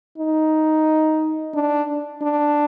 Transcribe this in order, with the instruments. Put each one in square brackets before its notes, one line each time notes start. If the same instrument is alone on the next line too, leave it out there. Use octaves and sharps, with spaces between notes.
[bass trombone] D#4
D4
D4